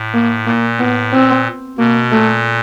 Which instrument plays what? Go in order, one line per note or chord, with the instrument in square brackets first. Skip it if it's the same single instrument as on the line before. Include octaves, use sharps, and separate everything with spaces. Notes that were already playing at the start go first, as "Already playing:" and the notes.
Already playing: [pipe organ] A2
[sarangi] A#3
[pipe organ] A#2 [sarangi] A#3
[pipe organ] A2 [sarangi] B3
[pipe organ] A#2 [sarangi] C4
[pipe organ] B2 [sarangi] A#3
[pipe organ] A#2 [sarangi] A3